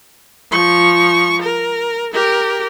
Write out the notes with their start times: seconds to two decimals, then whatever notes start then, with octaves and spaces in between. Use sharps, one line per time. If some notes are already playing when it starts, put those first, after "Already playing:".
0.51 F3 C#6
1.42 A#4
2.13 G4 A#4